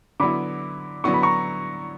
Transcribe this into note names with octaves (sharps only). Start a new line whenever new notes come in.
D3 F#3 B3 E4 B5 D6
D3 F#3 B3 E4 C#6
B5
A#5 C#6